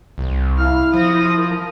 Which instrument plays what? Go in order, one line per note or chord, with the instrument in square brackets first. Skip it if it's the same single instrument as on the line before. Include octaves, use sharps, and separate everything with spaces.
[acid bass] C2
[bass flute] E4 [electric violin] F5 F6
[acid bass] F3 [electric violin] D#6 A#6
[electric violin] A#4